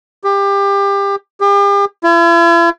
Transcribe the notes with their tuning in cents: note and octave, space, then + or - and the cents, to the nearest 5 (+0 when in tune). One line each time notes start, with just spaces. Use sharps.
G4 +25
G4 +40
E4 +45